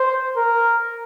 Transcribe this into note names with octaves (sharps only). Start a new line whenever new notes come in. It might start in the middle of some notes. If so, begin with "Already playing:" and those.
Already playing: C5
A#4